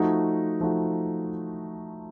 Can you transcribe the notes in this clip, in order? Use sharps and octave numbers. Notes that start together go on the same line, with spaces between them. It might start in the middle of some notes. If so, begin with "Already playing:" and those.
Already playing: F3 A3 D#4 F#4
F3 A3 D#4 F#4